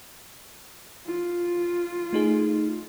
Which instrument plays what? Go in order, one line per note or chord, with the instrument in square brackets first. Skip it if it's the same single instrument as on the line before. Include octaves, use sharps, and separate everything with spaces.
[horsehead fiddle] F4
[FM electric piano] A3 D#4 G#4